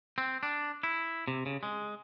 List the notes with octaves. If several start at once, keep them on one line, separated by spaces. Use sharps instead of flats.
C4
D4
E4
C3
C#3
G#3